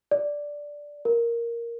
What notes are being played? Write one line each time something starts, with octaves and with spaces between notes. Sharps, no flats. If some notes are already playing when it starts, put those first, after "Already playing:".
D5
A#4